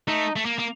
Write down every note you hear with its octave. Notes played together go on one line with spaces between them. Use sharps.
A3 D#4
A3
A#3
A#3